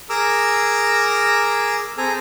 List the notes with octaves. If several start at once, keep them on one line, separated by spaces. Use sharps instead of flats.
G#4 A#4 A#5 D6 E6
C4 G#4 A4 G#5 A#5